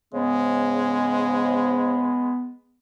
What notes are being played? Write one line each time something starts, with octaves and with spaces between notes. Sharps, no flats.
G#2 C#3 G#3 B3